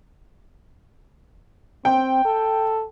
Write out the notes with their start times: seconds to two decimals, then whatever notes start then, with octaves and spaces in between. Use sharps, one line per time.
1.85 C4 G5
2.25 A4